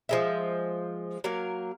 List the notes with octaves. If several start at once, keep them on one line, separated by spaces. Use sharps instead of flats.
F3 G#3 E5
F#3 A#3 A#4